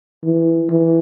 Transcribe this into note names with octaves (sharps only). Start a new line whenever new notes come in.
E3
E3